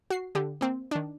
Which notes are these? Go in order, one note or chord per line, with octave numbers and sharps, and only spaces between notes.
F#4 C7
D3 G4
A#3 C4
D#3 D4